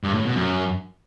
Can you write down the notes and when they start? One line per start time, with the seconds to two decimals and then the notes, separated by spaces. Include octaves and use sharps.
0.03 G2
0.14 A2
0.25 B2
0.35 F#2